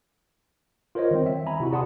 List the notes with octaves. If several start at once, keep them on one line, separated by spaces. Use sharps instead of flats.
F4 A#4 C5 C#5 D#5
D#3 G3 C4
E5
G#5 A#5 B5
C3 E4 F#4
G#4 D5 F#5 A5 C6 D#6